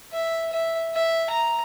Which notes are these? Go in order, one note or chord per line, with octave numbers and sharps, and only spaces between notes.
E5
E5
E5
A#5